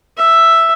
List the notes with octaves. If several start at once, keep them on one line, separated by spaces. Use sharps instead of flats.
E5